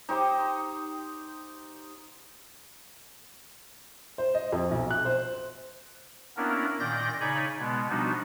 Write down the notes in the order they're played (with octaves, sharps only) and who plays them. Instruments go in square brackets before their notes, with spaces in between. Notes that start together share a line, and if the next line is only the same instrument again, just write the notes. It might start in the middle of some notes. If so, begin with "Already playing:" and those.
[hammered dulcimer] D#4 G4 C5
[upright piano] C5
D#5
F2
B1
F#6
C5
[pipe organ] A#3 B3 C#4 D4 E4 A#4
A#2 D#3 D5 G6 A#6
C#3 D#4 C#5 D5 G#5 B5
B2 G#3 B3
F3 G3 B3 D4 D#4 F#4